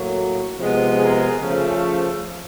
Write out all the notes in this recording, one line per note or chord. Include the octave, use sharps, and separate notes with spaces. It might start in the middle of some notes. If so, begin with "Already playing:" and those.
Already playing: A2 F#3 A#3
C3 F3 G#3 B3
G#4 A#4
C#3 F3 A3